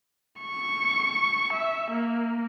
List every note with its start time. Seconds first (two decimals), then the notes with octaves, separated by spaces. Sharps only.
0.42 C#6
1.53 E5
1.91 A#3